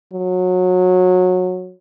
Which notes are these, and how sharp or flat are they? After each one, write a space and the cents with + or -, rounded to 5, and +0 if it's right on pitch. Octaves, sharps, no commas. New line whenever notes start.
F#3 -20